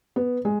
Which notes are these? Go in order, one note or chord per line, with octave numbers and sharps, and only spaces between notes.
B3
G#3